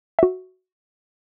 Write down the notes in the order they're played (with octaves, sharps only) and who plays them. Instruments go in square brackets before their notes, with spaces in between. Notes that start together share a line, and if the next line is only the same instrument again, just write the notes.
[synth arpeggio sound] F#4 E5